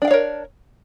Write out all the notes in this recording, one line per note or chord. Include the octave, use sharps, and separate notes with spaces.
D4 A#4 C#5 F5 G5